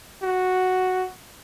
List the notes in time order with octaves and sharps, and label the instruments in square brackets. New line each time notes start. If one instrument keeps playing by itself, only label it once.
[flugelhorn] F#4